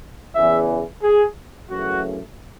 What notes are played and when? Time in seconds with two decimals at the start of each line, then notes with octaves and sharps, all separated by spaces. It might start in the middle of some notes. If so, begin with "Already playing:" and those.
0.35 E2 C#3 E3 E5
1.03 G#4
1.70 F#2 C#3 E3 A3 F#4